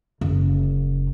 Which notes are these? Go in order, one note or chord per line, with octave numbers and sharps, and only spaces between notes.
F#1